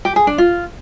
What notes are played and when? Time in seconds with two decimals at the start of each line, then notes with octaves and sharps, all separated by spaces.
0.05 G4
0.16 G#4
0.27 D4
0.38 F4